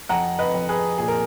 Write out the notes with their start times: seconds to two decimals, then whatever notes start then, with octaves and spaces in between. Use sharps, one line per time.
0.09 F2 F#5 A#5
0.39 B4 D#5
0.54 F2
0.69 G#4 B4
0.98 A#2 G#4
1.08 A#4